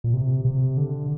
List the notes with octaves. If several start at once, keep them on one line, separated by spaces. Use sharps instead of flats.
A#2
C3
C3
D3